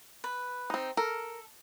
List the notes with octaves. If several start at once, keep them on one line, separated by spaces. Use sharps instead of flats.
B4
C4 D#4
A4 A#4